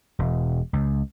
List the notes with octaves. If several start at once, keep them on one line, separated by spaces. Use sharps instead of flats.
E1
C#2